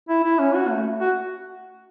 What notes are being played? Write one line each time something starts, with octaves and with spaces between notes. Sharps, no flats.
E4
E4
C#4
F#4
A3
F#4